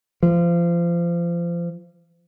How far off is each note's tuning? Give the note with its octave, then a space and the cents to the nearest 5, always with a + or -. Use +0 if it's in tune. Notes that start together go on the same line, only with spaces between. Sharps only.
F3 -30